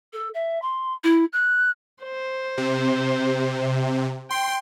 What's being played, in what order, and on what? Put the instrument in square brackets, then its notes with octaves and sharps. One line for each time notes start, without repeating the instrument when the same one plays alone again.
[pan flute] A4
E5
C6
E4
F#6
[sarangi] C5
[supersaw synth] C3
[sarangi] G5 [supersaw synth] C6